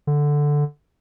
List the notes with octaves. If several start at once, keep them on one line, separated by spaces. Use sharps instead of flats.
D3